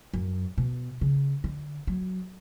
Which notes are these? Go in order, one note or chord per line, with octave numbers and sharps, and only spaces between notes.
F#2
B2
C#3
D3
F#3